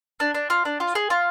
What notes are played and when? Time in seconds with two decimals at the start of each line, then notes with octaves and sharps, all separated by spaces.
0.20 D4
0.34 D4
0.50 F4
0.65 D4
0.80 F4
0.95 G#4
1.10 F4